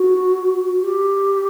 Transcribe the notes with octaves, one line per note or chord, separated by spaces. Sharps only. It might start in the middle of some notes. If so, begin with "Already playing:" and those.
Already playing: F#4
G4